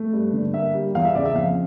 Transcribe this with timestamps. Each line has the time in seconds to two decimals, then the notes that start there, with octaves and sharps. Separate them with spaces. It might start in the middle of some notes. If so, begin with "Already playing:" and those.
Already playing: A3
0.13 G2
0.33 D3
0.54 A#3 E5
0.74 G3
0.95 E2 F5
1.05 E5
1.15 C#3 D5
1.25 E5
1.35 F2 F5